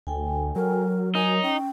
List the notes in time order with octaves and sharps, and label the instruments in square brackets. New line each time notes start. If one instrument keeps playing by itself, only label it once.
[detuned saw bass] D2 [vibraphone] A4 G5 G#5
[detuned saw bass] F#3 [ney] A#4
[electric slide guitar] D#4 [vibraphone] A#4 C#5 [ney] G#5
[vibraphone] C#4 [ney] G5